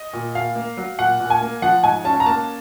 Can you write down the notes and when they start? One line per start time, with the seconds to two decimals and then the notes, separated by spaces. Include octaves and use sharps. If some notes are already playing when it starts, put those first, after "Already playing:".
Already playing: D#5
0.13 A#2
0.35 A#2 F5
0.56 A#3
0.77 F#3
0.99 A#2 F#5
1.20 A#2
1.30 G#5
1.41 A#3
1.62 F3 F#5
1.83 G#2 G#5
2.04 C#4 A5
2.20 A#5
2.26 A#3 A5